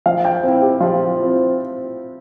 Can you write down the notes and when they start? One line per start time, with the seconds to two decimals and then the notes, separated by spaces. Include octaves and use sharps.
0.06 F3 F5
0.25 G5
0.43 C4 E4
0.62 G4
0.80 F3 F4
1.18 C4 E4